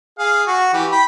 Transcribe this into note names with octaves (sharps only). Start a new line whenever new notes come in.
G#4 F5
F#4
E3 G4
G5 B5